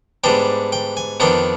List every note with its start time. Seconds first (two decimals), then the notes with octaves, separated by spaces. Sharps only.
0.24 G#2 G3 B3 D4 G5
0.72 G5
0.97 G#5
1.20 F2 D#3 B3 D4 G5